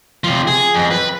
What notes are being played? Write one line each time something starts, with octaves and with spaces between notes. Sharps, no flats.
C3 F3
G#4
F2
B4